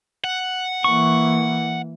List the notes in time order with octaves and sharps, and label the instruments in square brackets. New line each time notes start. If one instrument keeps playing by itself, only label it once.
[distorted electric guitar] F#5
[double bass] E3 A#3 [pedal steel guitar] C#6